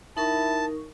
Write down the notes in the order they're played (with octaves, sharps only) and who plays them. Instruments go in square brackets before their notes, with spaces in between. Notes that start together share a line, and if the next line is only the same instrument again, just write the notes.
[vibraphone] D#4 A#4 C#6 [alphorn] E4 [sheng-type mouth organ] A5